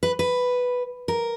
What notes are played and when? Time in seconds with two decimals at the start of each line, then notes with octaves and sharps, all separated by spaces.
0.03 B4
0.19 B4
1.08 A#4